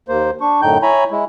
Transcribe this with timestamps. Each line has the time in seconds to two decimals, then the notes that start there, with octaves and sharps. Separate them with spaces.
0.08 D#2 A#3 C5
0.41 D4 C#6
0.62 F#2 A2 D3 D#4 G5 G6
0.82 E4 C#5 G#5 A#5 B5
1.11 G#3 E4